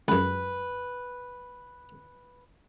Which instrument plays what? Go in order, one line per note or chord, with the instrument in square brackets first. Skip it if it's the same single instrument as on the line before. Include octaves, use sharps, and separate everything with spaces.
[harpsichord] C#2 F#2 [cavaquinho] B4